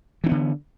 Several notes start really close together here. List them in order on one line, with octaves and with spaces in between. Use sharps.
E3 D4 B3 D3